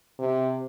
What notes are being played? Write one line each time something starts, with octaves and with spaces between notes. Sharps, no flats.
C3